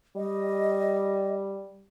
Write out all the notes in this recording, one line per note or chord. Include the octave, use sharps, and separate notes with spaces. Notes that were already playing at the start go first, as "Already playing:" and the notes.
G3 D#5